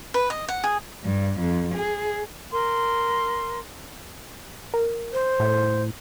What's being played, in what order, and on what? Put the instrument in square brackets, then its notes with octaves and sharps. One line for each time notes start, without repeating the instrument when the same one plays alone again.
[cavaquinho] B4
D#5
F#5
G#4
[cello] G2
F2
G#4
[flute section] A#4 C6
[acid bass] A#4
[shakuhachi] C5
[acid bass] A2